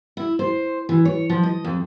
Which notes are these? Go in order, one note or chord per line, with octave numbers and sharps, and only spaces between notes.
E4
C5
E3
C#5
F3
D#5
F2